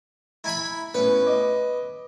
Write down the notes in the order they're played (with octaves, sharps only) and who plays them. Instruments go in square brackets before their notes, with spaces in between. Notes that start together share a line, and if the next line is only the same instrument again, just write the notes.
[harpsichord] E4 G#5 B5 [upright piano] A#5
[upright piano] A2 B3 C#4 [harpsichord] B4
[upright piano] D#5 D6